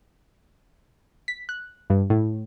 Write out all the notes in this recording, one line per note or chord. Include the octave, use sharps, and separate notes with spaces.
B6
F#6
G2
A2